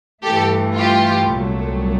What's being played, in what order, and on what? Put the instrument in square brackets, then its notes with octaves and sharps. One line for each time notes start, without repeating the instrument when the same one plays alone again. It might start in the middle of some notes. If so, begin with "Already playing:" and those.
[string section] G2 E3 A3 G4 A4
F4 G4
C2 A#2 F#3 A3